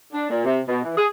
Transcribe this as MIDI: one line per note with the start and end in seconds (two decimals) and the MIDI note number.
0.13 0.29 62
0.30 0.43 46
0.45 0.60 48
0.68 0.84 47
0.85 0.92 52
0.98 1.06 68